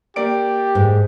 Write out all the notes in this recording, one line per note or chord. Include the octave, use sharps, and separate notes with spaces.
A#3 G4 D5 D7
G#2